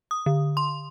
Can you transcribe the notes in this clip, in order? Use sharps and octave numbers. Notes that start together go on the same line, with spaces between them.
D#6
D3
C6